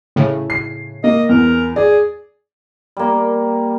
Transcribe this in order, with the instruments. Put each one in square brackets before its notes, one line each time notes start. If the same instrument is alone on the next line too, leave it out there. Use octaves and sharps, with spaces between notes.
[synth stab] A2 C#3
[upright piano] C7
[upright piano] A#3 [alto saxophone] D#5
[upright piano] E2 [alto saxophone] A#4
[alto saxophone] G#4 [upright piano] D5
[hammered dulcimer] G3 A#3